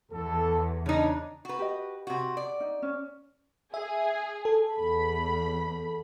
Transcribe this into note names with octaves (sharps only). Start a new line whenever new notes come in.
E2 A4
C#3 D4 D#4
F#4 B4
G4 D#5
C3 F#4
D5
D#4
C#4
G#4 E5
A4
E2 B5